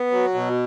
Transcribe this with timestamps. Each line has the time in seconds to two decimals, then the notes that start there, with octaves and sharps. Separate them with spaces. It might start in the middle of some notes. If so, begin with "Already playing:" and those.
Already playing: B3
0.11 F#3
0.34 B2